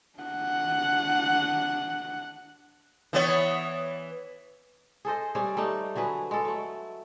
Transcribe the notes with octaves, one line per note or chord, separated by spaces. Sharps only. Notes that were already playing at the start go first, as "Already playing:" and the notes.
D4 F#5
E3 B3 C#5
G#4 A4 C5 D#5
G3 C4 G#4 C#5
G3 A3 D#4
D3 F#3 G#4 B4
G#3 A4
F#3 A3